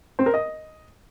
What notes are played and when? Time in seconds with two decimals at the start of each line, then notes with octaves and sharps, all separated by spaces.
0.19 C4
0.26 A#4
0.34 D#5